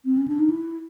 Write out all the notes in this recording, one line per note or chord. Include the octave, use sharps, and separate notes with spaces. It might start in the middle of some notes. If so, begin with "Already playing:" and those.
C4
C#4
D4
D#4
E4